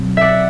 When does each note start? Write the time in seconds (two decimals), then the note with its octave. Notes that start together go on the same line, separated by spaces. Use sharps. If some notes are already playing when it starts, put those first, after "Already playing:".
Already playing: B2 F#3 C4
0.17 D5 E5 F#5